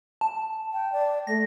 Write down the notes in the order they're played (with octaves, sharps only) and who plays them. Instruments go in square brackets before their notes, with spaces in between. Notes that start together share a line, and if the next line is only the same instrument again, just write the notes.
[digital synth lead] A5
[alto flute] G5
D5
[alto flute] A3 [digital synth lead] A#6